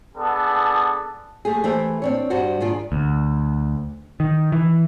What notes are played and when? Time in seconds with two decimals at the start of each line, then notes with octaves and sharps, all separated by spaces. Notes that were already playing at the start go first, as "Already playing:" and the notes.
0.16 B3 D4 G#4 A4
1.45 A3 G4 G#4
1.64 E3 A3 G4 C5 E5
2.02 C4 D4 C#5
2.30 G2 G3 D4 F#4 C5
2.61 G#2 D#3 D4 F4
2.92 D2
4.20 D#3
4.52 E3